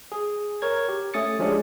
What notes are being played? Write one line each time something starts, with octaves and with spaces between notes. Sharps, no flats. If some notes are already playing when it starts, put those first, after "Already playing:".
G#4
A#4 C#5 G#6
G4
A3 C#4 D#6 A6 C#7
F3 G#3 C#4 D4 G4 G#4